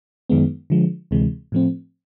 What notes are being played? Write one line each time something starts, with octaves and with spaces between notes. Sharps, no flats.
F#2 D#3 G#3 B3
D3 F3 G#3
D2 C3 E3 G#3
A2 F3 A3 C4